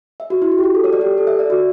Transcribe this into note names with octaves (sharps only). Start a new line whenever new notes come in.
E5
F#4
E4
F#4
G4
F#4
A4
C#5
D5
G4
A4
E5
D5
F#4